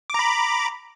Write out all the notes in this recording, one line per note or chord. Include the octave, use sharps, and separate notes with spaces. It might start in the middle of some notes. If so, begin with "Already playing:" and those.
A#5 B5 D6